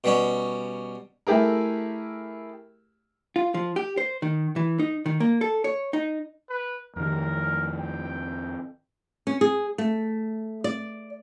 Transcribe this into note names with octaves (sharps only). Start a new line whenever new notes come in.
B2 G3 C#4
A3 E4 G4 G#4 A#4
F4
F3
G4
C5
D#3
E3
D#4
D#3
A#3
A4
C#5
D#4
B4
F2 D#3 A#4
G5
C#4
G#4
A3
D5